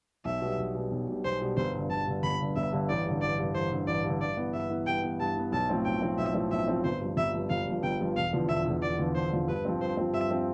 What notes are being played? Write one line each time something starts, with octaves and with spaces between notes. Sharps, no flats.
B1 E5
B2 G3
B1
B2 G3
B1
B2 G3
B1 C5
B2 G3
G1 C5
G2 D3
G1 A5
G2 D3
G1 B5
G2 D3
G1 E5
G2 D3
A1 D5
G2 D3
A1 D5
G2 D3
A1 C5
G2 D3
A1 D5
G2 D3
G2 D5
E3 B3
G2 E5
E3 B3
G2 G5
E3 B3
G2 A5
E3 B3
B1 A5
A2 F3 A3 C4
B1 G5
A2 F3 A3 C4
B1 E5
A2 F3 A3 C4
B1 E5
A2 F3 A3 C4
G1 C5
G2 F3
G1 E5
G2 F3
G1 F5
G2 F3
G1 G5
G2 F3
E1 F5
E2 D3 F3
E1 E5
E2 D3 F3
E1 D5
E2 D3 F3
E1 C5
E2 D3 F3
G2 B4
F3 C4
G2 C5
F3 C4
G2 E5
F3 C4